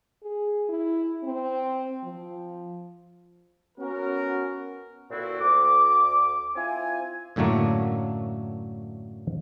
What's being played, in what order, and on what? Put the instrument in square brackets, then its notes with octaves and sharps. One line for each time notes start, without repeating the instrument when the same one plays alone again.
[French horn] G#4
E4
C4
F3
[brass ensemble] B3 C#4 F#4 A#4
[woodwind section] A#2 D3 B3 C4 E4 F#4
D2 D6
C4 E4 F4 G#5
[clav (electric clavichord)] F#2 A2 D3 F#3 A3 A#3